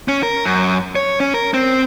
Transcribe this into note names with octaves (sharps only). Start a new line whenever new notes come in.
C#4
A#4
F#2
C#5
C#4
A#4
C4